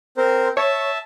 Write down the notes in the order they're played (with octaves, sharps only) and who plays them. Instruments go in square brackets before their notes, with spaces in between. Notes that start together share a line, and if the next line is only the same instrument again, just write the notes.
[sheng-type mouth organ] C4 A#4 C5
[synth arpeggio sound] C#5 [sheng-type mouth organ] E5 A5